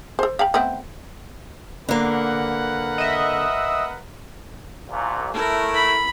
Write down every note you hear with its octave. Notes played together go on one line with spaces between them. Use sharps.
A4 C5
F5 G5 B5
A3 B3 C4
D3 A#3 A#4 B4 F#5
D#5 E5
C2 A#2
A3 E4 A#4
B5